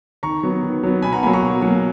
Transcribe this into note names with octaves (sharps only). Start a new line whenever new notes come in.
D#3 A#5 C#6
F#3 B3
D#3
F#3 B3
B2 G#5 B5
F#5 A#5
F#3 A#3 G#5 B5
A#5 C#6
B2
F#3 A#3